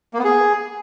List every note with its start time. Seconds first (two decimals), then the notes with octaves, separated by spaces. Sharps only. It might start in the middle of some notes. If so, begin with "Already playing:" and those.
0.14 A#3
0.19 B3
0.24 G#4